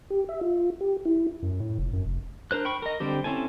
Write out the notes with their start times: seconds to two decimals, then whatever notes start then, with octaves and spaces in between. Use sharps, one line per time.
0.10 G4
0.29 E5
0.41 F4
0.81 G4
1.05 E4
1.42 F#2
1.60 A2
1.78 F1
1.93 F#2
2.06 F1
2.51 D4 A#4 C5 F#6
2.65 G5 B5 C#6
2.82 A#4 D#5
3.00 D3 G3 C4 G4
3.24 C4 C#4 E4 A4 G#5